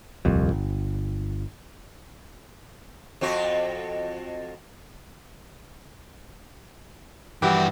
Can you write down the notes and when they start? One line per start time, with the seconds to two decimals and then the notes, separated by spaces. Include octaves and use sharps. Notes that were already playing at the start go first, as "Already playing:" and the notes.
0.25 D#1 C2 F2
0.51 G1
3.21 F2 C4 F#4
7.42 G2 E3 F#4 G4